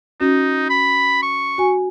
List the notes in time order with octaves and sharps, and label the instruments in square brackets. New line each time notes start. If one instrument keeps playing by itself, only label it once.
[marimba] C#4 F#4 [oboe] D#4
[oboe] B5
C#6
[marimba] F#4 G#5